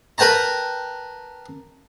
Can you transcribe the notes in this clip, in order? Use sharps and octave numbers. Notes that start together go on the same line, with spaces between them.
A#4 B4 G5 A5 A#5